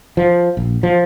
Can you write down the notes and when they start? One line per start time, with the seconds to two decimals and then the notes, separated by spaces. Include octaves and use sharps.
0.17 F3
0.57 A#1
0.83 F3